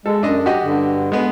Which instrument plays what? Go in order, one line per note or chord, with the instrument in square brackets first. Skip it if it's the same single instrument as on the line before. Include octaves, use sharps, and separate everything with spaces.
[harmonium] G#3 [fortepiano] A4
[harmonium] F#2 [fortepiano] D4 D#5
[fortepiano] F#4 G4 D#5
[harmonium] G2 D3
[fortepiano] G#3 B3